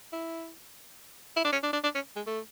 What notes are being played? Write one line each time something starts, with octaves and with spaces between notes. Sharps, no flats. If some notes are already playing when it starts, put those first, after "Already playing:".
E4
E4
D4
C#4
D4
D4
D4
C#4
G#3
A3